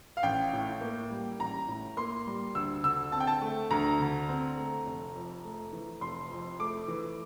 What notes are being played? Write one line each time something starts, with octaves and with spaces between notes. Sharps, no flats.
F5
A1 G5
A2
A#3
G3
A1 A#5
A2
A#3 C6
G3
D2 E6
D3 E6
C4 A5
G5
A5
A3
D2 A#5
D3
C4
A3
F1
F2
A3
E3
F1 C6
F2
A3 D6
E3